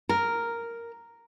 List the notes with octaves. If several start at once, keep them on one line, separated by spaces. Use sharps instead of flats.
A#4